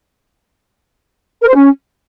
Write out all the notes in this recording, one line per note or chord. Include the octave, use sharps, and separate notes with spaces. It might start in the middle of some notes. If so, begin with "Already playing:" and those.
A#4
C5
C#4